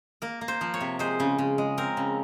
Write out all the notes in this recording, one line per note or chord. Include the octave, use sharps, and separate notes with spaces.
A#3 A#4
A#3
C5
F3
C#5
C3
G#3 C5
C#3
C#3
G#3
C4 A#4
C#3